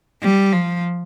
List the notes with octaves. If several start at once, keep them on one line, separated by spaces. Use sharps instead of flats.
G3
F3